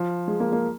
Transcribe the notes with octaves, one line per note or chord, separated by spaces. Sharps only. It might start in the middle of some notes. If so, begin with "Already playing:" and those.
Already playing: F3
G#3
A#3
A#3